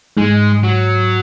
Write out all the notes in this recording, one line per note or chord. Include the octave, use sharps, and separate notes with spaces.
G#2 G#3
F#3